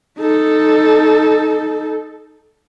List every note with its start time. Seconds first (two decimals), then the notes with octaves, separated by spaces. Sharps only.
0.19 D#4 A4